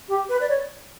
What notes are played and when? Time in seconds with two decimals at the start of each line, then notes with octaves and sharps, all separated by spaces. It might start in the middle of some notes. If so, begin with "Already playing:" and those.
0.08 G4
0.29 B4
0.40 D5
0.49 C#5